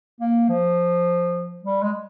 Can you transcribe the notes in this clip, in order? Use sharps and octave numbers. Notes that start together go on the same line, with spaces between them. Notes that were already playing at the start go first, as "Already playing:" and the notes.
A#3
F3
G3
G#3